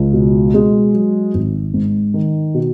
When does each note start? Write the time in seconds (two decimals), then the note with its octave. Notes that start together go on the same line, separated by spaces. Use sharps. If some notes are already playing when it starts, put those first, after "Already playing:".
Already playing: C#2
0.13 B2
0.54 G#3
0.94 F#3
1.34 G#1
1.74 G#2
2.14 D#3
2.54 B2